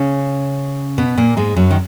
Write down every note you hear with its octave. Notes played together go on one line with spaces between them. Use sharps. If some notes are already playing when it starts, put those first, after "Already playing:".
Already playing: C#3 C#4
B2 B3
A#2 A#3
G#2 G#3
F#2 F#3
D#3